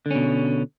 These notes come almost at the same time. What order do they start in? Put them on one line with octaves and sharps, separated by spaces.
D3 C#4 B2